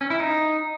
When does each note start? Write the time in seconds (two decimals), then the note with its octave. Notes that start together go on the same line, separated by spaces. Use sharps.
0.01 C#4
0.10 E4
0.20 D#4